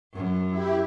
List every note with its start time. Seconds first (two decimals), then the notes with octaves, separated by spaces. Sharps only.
0.15 F#2
0.50 E4 G4